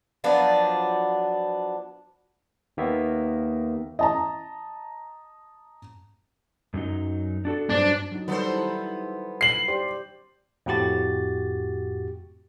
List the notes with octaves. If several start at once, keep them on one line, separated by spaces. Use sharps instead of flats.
F3 F#3 B3 D4
D#2 D#3 A#3 B3 E5
D#5 A5 A#5
F#2 F#3 D#4
D4 F#4 A4
G2 F#3 D4 C5
F#3 D#4
D#3 G3 B3 A4 C5
E4
C7 F#7
G4 C5 D5
F2 A2 F#4 G4 A6